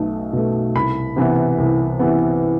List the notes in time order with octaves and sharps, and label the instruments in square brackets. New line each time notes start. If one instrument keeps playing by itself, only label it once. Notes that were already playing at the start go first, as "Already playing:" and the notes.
Already playing: [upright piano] B1 B2 A3
B2 A3
C2 B5
C3 E3 B3
C2
C3 E3 B3